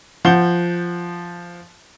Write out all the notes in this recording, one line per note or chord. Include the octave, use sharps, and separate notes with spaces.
F3 F#5 G6 G7